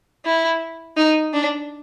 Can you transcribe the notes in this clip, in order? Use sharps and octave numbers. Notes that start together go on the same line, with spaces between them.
E4
D#4
D4